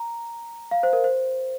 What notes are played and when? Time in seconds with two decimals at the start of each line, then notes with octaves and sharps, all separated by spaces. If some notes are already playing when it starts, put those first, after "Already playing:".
Already playing: A#5
0.71 F5
0.83 C5
0.93 A#4
1.04 C5